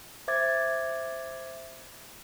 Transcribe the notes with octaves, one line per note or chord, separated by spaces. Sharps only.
C5 E5 D6 G#6 A6